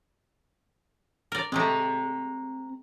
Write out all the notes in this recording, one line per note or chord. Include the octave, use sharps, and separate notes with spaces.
A#4 D5
G#3 A3 C4 G4 A#5